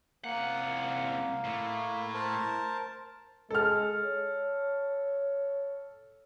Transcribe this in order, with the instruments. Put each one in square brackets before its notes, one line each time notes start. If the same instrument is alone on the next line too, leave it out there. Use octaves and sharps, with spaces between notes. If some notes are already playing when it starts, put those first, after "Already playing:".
[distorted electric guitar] C2 F#5 [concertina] A#3
[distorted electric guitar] A2 A3
[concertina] A#4 C5 A5
[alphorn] G#3 [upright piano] A4 F6
[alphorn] C#5